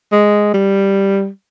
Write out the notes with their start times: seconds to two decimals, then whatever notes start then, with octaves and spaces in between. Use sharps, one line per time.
0.12 G#3
0.54 G3